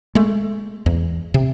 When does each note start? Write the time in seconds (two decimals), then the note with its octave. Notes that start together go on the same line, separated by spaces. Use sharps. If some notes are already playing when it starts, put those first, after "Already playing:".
0.15 G#3 A3
0.86 E2
1.34 C3